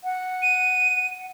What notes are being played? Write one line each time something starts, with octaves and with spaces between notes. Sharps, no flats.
F#5
D#7